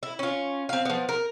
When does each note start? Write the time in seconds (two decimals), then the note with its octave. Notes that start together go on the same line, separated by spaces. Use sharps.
0.03 E4
0.19 C#4 F4
0.69 C4 F5
0.85 F3 B3
1.09 A#4